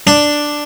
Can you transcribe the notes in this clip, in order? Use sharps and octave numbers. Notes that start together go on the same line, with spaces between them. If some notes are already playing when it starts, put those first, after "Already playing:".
D4